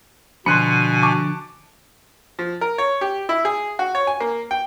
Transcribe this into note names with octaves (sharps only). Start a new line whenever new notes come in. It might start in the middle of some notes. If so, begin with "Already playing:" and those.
B2 D3 F3 G#5 B5 C6 F#6 C#7
A5 C#6 D6
F3
A#4
C#5
G4
E4
G#4
F#4
C#5
G#5
A#3
G5